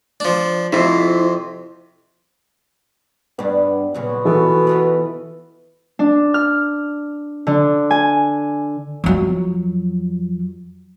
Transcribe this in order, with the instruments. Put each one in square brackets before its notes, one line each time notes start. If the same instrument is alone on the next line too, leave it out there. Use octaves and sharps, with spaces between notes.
[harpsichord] F3 D4
[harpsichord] F2 C3 [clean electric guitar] E4 F4 C5
[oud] G2 D4 [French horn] B3
[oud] A#2 C#3 F#3 [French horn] B3
[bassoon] B2 [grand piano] E3 A4
[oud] B3 F4 F#4 [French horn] B4
[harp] D4
F6
D3
G#5
[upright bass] F2 F#3